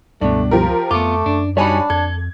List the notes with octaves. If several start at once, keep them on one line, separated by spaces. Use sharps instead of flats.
C#2 G2 B2 A3 D4
F3 F4 G4 A#4
F2 A3 B3 F4 D6
F#2 D4
G3 D4 D#4 F#4 C#5 G#5 B5
F2 A4 G#6